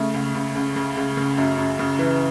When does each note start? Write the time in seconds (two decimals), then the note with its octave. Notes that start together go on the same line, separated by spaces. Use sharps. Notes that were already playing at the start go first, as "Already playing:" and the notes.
Already playing: C#3 A3
0.14 C#2
0.34 C#2
0.55 C#2
0.76 C#3
0.96 C#2
1.17 C#3
1.37 F#2
1.58 F#2
1.79 C#3
1.99 E3